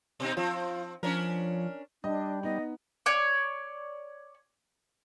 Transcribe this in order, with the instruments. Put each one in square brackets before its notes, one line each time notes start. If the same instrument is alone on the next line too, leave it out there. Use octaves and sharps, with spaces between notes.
[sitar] B2 C4 D#4
[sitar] F3 C4 [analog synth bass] F4
[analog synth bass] F3 [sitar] C#4 D4 A#4
[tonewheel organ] G3 [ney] D4 [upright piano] D#5
[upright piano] B3 D#4 [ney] D#5
[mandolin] C#5 D5